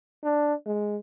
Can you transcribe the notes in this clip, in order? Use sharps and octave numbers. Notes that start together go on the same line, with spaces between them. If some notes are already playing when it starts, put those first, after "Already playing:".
D4
G#3